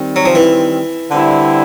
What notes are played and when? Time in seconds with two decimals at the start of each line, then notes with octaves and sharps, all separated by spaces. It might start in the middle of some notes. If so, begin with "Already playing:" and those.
Already playing: D#3 G3 C4
0.16 F#3
0.26 F3
0.35 E3
1.11 D3 G3 C4 E4